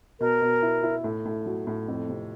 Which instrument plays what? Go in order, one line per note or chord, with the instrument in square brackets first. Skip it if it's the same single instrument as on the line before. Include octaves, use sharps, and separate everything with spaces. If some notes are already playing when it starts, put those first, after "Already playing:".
[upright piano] B2 [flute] A#4
[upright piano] B2
E4
E4
A2
A2
F#3
A2
F2
C3